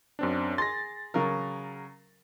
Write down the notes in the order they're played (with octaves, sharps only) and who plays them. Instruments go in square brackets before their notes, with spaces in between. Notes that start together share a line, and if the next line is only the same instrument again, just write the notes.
[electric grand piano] F#2 C4 D4
[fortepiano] G#4 C6 [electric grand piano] A6 A#6
[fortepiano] C#3 F#3 A#4